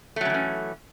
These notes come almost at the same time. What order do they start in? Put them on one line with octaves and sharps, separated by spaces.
A3 F#3 C#3 E3 C#4